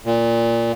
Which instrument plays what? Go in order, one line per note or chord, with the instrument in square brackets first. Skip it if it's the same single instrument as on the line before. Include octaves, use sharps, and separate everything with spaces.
[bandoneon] A#2